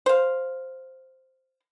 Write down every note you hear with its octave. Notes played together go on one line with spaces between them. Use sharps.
C5 F5